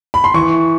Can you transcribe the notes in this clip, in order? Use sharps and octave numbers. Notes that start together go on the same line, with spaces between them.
B5
C6
E3 C#6